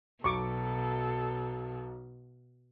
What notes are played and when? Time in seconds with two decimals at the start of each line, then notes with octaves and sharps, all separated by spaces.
0.24 B1 B2 A4 C#6 D6